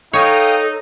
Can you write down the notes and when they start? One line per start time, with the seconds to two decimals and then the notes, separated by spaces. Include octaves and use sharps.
0.13 D#4 A4 C#5 F5 G5 D#6